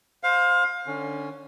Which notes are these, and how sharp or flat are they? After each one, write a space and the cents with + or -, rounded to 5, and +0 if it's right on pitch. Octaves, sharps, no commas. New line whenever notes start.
C5 +0 F5 +25
D3 +20 C#4 +0